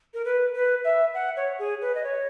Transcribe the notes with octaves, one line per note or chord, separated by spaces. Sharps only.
A#4
B4
B4
E5
F#5
C#5
G#4
B4
D#5
C#5